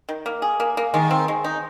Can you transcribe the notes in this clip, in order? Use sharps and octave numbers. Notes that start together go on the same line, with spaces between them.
D#3
A#3
G#4
A#3
A#3
D#3 G#3
C4
G#3
D#4